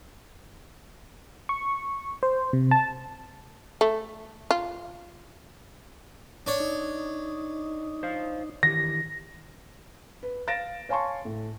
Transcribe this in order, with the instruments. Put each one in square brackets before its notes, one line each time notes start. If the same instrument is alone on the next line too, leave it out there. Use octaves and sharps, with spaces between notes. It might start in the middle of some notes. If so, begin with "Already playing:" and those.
[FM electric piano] C#6
C5
C3
A5
[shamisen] A3
F4
[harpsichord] D4 C#5
[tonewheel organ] D#4
[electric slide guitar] C5 F5
[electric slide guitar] D#3 E3 G4 [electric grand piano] A#6
[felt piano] B4
F5 A6 A#6 D7 E7
C#5 F5 G#5 A5 C6 C#6
A2